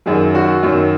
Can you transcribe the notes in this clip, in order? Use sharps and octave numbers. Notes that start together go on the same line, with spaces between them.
F#2 D#3 F#3 G#4
F#4
F#2 D#3 F#3